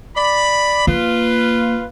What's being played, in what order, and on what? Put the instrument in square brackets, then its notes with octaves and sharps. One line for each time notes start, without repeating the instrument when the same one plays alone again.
[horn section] D5 B5
[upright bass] A#3 [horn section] F4 B4